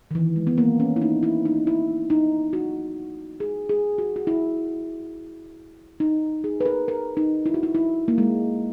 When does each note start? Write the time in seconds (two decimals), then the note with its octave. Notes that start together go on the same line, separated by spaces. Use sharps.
0.11 D#3
0.15 E3
0.36 G#3
0.47 B3
0.58 A#3
0.80 C#4
0.96 E4
1.02 D#4
1.23 E4
1.45 D#4
1.67 E4
2.10 D#4
2.53 F#4
3.40 G#4
3.69 G#4
3.98 F#4
4.16 F#4
4.27 E4
6.00 D#4
6.44 G#4
6.61 B4
6.66 A#4
6.88 A#4
7.17 D#4
7.46 E4
7.54 F#4
7.63 E4
7.75 E4
8.08 A#3
8.18 G#3